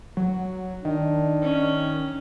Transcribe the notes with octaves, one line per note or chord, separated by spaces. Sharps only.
F#3
D#3 D4
C#4